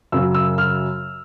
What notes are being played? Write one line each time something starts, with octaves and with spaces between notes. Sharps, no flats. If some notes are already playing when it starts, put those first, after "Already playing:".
F#2 C#3 F#3 E6
E6
F6